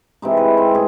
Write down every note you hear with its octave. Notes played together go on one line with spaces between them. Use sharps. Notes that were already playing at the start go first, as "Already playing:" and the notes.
C3 E3 G#3 D#4
B4
C4
A2 G#4